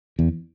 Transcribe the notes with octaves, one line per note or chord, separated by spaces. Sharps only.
E2